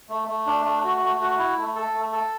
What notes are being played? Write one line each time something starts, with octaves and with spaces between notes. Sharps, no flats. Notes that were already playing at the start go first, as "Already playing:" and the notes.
A3
A3
D4
A3
F#4
A3
F#4
E4
A3
A4
A3
A4